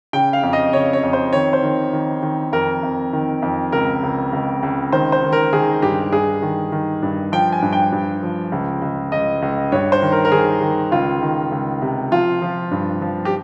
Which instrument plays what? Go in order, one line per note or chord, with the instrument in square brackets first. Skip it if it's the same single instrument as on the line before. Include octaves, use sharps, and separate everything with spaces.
[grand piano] C#3 G5
F5
F2
D#5
C#3 C#5
C#5
F2
C5
D#3 C#5
C5
D#3
D#3
D#3
F2 A#4
F2
D#3
F2
C#2 A#4
C#2
C#2
C#2
D#3 C5
C5
D#3
A#4
D#3 G#4
G2 G4
G2 G#4
D#3
D#3
G2
F3 G5
G#5
G2
G5
G2
F3
C#2
C#2
C#2 D#5
C#2
G2 C#5
C5
D#3
A#4
A#4
D#3 G#4
D#3
C#2 F4
D#3
C#2
C3
F3 F4
F3
G2
F3
G4